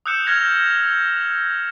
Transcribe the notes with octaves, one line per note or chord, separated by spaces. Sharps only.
D#6 E6 F#6 G6 C#7 E7
F6 F#6 G#6 A#6 C#7 F7